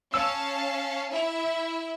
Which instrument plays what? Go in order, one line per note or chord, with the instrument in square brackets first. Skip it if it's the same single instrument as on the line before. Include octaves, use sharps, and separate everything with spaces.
[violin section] C#4 F5 A5 [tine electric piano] E6
[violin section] E4 E5